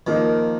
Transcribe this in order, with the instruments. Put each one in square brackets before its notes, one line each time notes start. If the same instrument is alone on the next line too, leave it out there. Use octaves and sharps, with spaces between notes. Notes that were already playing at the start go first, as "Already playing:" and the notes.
[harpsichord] D#3 [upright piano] F3 A#3 D#4